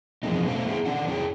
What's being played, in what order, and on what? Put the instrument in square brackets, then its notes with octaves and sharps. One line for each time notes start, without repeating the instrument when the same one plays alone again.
[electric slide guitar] E3 F3 G#3 A#3 C4 D#4
B2 A3 C#4 C5 F5 A#5
B3 E4 G#4 E5 G5 A#5
D#3 C#4 D4 F#5
C#4 D4 E4 G#4 C#5 G5